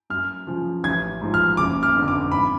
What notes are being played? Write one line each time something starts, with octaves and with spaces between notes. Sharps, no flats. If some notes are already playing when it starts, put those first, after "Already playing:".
F#2 F6
C#3 F3
A1 G#6
G#2 F3
F6
F#1 D6
F6
F2 D3
D6
G#1 B5